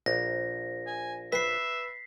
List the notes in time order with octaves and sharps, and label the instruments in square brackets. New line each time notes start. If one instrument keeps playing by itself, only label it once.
[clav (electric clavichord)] A#1 [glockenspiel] A#6
[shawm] G#5
[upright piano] B4 [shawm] E5 [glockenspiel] B6 C7